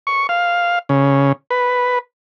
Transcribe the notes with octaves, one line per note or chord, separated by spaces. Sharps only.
C#6
F5
C#3
B4